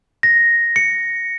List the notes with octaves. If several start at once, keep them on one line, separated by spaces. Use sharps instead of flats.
A#6
C#7